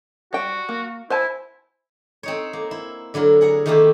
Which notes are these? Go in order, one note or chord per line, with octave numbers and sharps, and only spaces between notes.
G3 F#4 G5
A#3
E4 C5 G#5 A5
C4 D#4 C#5
A#3
E4
D3 F#3 E4 A#4
G#4 F#5 A#5
D#3 A3 A#3 C4 E4 G4